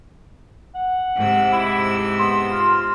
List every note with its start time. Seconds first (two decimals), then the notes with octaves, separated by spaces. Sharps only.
0.75 F#5
1.16 G#2 C3 E6
1.52 E4
2.19 B3 C6
2.52 F4